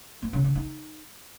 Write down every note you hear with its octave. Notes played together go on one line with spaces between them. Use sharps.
B3
C#3
D3
D#4